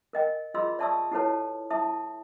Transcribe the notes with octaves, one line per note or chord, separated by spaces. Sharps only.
A#4 D#5 G5
F4 G#4 D#5 B5 C6 E6
D5 E5 A5 C#6 D#6 E6
E4 G4 A4 B4 C#5 A5
E4 E5 A5 D#6